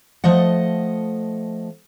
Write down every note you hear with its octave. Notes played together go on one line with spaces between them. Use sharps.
F3 A3 D#5 F#5